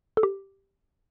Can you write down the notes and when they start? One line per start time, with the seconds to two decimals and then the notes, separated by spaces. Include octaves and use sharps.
0.17 A4
0.23 G4